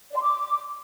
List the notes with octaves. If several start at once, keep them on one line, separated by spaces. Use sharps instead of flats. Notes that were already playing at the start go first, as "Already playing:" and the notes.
D5
C6
D6